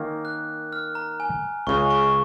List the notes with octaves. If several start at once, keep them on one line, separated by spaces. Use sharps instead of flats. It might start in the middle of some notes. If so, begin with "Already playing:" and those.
Already playing: D#3 A#3 C#4
F#6
F6
A#5
G#5
C#2 C#3 G#3 C#6
C#6